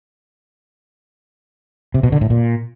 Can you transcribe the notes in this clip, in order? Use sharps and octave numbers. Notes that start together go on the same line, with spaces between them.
C3
B2
D3
A2
A#2